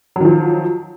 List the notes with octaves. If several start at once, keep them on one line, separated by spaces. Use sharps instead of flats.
D#3 F3 F#3